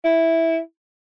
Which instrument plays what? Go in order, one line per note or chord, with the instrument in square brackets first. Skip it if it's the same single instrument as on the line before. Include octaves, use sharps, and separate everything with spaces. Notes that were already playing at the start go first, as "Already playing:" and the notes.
[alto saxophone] E4